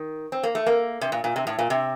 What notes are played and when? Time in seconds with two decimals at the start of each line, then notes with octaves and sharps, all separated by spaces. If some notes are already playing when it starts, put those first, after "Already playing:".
Already playing: D#3
0.32 C4
0.43 A#3
0.55 A3
0.67 A#3
1.01 C3
1.12 A#2
1.24 A#2
1.36 C3
1.47 A2
1.59 A#2
1.70 C3